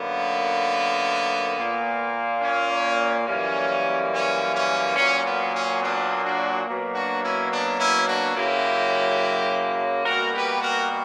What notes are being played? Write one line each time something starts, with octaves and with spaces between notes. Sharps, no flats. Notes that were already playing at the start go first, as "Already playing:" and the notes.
Already playing: F#2 D3 A#3 B3
A#2 A#3
C#4
F#2 E3 G3 A#3 C#4
C#4
C#4
A#2 F#3 A#3 C#4
B3
C#4
B3 D4
D4 F#4
B2 F#3 A#3
D4 F#4
C#4 E4
B3 D4
C#4 E4
D4 F#4
F#2 C#3 F#3 A#3 E4 G4
B2 G3 A#3 F#4 A#4
G4 B4
F#4 A#4